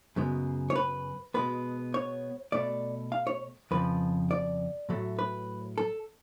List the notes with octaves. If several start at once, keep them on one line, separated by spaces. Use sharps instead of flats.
F#2 C#3 G#3 B3
C#5
B4
B2 G#3 B3 B4
C#5
B2 A3 D5
F5
C#5
F2 C#3 F3 B4
D5
A2 F#3 A3
B4
A4